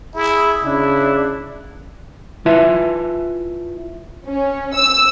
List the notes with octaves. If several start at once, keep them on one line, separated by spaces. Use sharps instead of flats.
E4 G#4
C#3 D4 E4
E4 F4 B4 E5 G#5 A5
C#4
E6